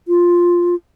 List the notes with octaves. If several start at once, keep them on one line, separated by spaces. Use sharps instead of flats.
F4